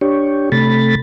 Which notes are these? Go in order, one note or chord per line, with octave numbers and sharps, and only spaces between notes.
D4 G4 C#5
C3 A3 B5 A6